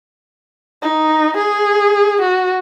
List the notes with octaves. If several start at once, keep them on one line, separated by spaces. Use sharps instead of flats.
D#4
G#4
F#4